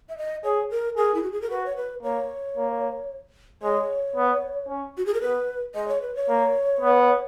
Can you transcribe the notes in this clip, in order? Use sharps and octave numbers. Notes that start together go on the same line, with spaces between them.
E5
D#5
G#4 C#5
A#4
G#4 A#4
E4
F#4
G#4
A#4
F#4 B4
C#5
B4
A#3 C#5
A#3
G#3 C#5
B3
C#4
F#4
G#4
A#4
B3 B4
G#3 D#5
C#5
B4
C#5
A#3
B3